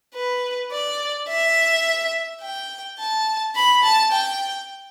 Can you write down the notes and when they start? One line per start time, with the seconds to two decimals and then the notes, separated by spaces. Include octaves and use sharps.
0.15 B4
0.72 D5
1.29 E5
2.41 G5
2.99 A5
3.55 B5
3.83 A5
4.12 G5